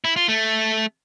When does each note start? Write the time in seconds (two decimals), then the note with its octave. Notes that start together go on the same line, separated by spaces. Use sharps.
0.05 E4
0.16 F4
0.28 A3